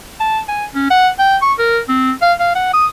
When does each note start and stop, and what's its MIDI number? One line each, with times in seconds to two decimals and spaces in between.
0.20 0.40 81
0.48 0.65 80
0.75 0.87 61
0.90 1.09 78
1.19 1.37 79
1.42 1.53 85
1.59 1.80 70
1.89 2.12 60
2.22 2.33 77
2.40 2.53 77
2.55 2.70 78
2.74 2.86 87